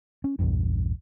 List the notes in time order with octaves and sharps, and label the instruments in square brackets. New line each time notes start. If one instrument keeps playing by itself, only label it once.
[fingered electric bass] C#4
A#1 E2 G2